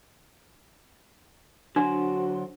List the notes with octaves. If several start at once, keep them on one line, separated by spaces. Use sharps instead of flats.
D3 F#3 D4 F#4 C5